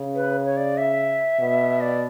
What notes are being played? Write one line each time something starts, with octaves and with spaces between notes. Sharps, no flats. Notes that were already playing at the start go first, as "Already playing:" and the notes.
Already playing: C#3
B4
C#5
D5
E5
B2
D5